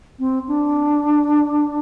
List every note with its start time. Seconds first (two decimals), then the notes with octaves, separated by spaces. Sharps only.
0.19 C4
0.48 D4